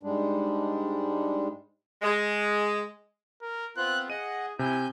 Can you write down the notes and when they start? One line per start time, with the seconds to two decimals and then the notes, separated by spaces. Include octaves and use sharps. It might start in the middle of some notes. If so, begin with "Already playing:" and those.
0.03 G#2 G3 G#3 D4
2.02 G#3
3.41 A#4
3.77 B3 C4 F4 F#6
4.10 G#4 D#5 F#5 D#7
4.59 C3 E4 G#5 G6